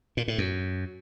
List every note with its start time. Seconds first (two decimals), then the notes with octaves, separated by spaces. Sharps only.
0.17 A#2
0.28 A2
0.38 F#2